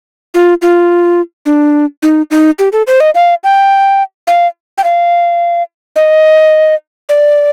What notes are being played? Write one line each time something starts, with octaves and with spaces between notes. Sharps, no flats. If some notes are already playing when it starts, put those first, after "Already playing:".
F4
F4
D4
D#4
D#4
G4
A4
C5
D#5
F5
G5
F5
G5
F5
D#5
D5